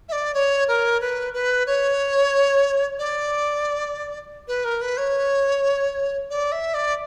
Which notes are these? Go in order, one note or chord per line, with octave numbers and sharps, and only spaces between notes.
E5
D5
C#5
A#4
B4
B4
C#5
D5
B4
A#4
B4
C#5
D5
E5
D5